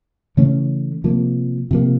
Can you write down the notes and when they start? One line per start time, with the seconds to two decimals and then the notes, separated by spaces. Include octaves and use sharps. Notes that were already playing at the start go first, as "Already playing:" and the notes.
0.37 C#3 E3 A3 C#4
1.04 C3 F3 A#3
1.71 C3 F3 A#3